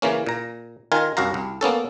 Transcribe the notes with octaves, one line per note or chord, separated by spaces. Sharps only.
C#3 E3 A#3 C#4
A#2 A#5
D#3 F4 A#4 G#5
C2 F#2 F#4 F5 A#5
C2
A#3 B3 C#4 A4